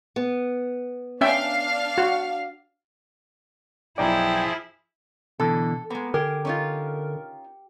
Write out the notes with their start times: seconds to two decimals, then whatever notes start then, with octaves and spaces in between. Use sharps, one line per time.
0.16 B3
1.21 C#4 D4 E5 F5 G5
1.98 F#4
3.98 B1 F3 D#4 E4 G#4 D5 G5
5.40 B2 D3 E3 A4
5.90 G#3 A#3 B3
6.14 D3 G4 G#4 A#4
6.45 C#4 D#4 F4